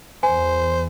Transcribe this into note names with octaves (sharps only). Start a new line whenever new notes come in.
E2 C5 G#5